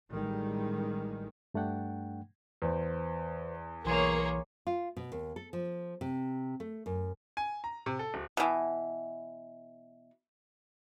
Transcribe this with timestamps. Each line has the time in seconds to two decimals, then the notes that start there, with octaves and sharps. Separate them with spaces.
0.11 A1 D#3 G3 G#3
1.54 G2 A3 D4 F#5 G5
2.62 E2 B4 C5
3.85 B1 E3 A#3 G#4 A#4 C#5 C6
4.67 F4
4.97 B2
5.12 D#2
5.36 A4
5.53 F3
6.01 C3
6.60 A3
6.86 F#2
7.37 G#5
7.64 A#5
7.86 C3
7.99 A4
8.14 D1
8.37 B2 E3